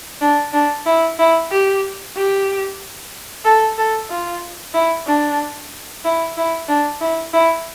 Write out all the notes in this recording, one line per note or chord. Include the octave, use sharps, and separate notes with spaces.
D4
D4
E4
E4
G4
G4
A4
A4
F4
E4
D4
E4
E4
D4
E4
E4